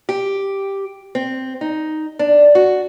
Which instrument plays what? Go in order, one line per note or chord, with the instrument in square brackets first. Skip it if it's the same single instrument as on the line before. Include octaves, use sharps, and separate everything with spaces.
[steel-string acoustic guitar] G4
C4
D#4
D4
F#4